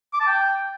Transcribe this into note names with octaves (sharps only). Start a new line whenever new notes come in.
D6
A5
G5